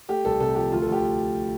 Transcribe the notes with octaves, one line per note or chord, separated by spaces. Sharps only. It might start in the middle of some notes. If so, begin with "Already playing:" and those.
A3 G4
C2 A4
C3 A4
F3 G4
D2 F4
A4
D2 G4